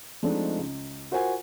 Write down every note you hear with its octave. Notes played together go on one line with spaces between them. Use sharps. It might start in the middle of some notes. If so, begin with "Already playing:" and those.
F3 G#3 A3 C4 D4 D#4
C#2
F4 F#4 A#4 C5 F#5 G#5